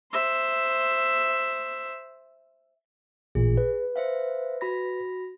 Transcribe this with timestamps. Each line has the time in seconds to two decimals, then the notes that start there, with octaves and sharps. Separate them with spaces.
0.12 C5 E5
3.35 A1 A#2 G#4
3.58 B4
3.96 C5 E5 F5
4.61 F#4 B5 A#6